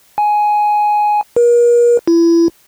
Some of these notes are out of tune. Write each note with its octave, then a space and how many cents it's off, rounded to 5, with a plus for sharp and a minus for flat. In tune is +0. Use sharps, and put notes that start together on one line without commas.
G#5 +10
A#4 +40
E4 +30